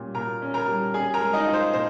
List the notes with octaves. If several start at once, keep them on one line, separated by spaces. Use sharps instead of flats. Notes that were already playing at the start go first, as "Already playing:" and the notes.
Already playing: A#2 G3 C#4
A#2 A#4 A#5
C#4
A#4 A#5
G3
C#4 G#4 G#5
A#4 A#5
G#3
D#4 D#5
F4
C5
A#2 C5